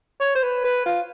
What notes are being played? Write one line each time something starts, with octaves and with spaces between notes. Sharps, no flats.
C#5
C5
B4
B4
F4